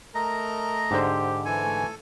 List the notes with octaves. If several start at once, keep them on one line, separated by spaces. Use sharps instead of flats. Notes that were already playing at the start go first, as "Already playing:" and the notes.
A3 A#4 D#5 A#5
G#2 D3 G4 C5
E3 A4 G#5
A3